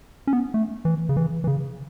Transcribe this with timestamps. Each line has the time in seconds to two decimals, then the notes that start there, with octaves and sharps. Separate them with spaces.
0.27 C#4
0.33 B3
0.54 A3
0.85 E3
1.09 C#3
1.17 E3
1.44 E3
1.47 C#3